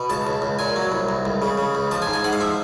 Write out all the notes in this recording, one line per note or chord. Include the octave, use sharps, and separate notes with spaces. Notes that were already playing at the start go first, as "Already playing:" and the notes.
Already playing: B2
C#2 A5
C#2
C#2
A#2 G#5
F#3
C2
C2
C#2
C#3
C#3
C#2
F3 A5
G#5
G#2
G#5
G#2 F#5
F5
F3 E5